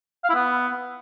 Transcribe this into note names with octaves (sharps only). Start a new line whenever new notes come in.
F5
E4
B3